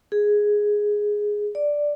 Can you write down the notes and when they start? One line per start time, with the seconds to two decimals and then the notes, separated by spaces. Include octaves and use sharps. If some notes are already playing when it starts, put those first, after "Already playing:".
0.12 G#4
1.55 D5